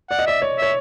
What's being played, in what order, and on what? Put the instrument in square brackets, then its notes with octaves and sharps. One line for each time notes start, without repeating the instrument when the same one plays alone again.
[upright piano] D5 [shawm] F#5
[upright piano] D#5
[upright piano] D5 [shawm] E5
[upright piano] C#5
[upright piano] C#5 [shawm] E5